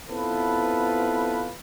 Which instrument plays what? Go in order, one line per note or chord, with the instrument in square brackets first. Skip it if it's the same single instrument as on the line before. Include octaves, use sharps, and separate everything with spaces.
[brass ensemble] B3 C4 E4 F4 A4 B4